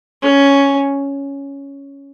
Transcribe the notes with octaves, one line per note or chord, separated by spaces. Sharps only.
C#4